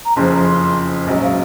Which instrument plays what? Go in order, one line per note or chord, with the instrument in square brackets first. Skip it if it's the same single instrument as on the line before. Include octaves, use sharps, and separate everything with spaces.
[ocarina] A#5
[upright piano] F#1 F2 C#3 F3 [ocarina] C6
[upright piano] A#1 G#2 F#3 C#4 [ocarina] D#5
[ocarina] F5